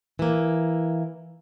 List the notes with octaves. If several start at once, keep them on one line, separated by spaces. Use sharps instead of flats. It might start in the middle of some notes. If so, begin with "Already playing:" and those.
E3 A#3